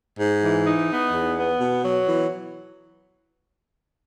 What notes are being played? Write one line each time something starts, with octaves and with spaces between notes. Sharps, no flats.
G#2
E3
D#4
B3
E2
B3
B2
F#3
E3